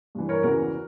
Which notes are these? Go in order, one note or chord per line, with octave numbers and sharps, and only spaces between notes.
G2 E3
A#4 C#5
E2 C#3 E3 F#4 A#4